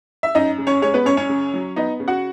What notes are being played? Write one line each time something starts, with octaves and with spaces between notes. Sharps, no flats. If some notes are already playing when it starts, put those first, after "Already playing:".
E5
F#2 D#4 D#5
C#3
C#4 C#5
G#3 C#4 C#5
B3 B4
F#2 C#4 C#5
C#4 C#5
C#3
F#3
B3 D#4 D#5
C#3
F#4 F#5